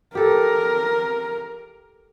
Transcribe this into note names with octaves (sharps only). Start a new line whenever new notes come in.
G4 A4 A#4